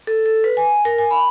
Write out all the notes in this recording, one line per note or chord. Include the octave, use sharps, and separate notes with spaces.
A4
A4
B4
G#5
A#4
G#5
B5